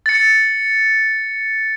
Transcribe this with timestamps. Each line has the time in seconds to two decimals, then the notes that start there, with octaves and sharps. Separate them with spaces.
0.06 A6 C#7